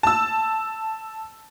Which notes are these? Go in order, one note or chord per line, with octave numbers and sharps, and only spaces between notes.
A5 E6